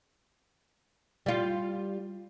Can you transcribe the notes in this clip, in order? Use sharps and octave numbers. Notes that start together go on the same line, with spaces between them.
G3 F4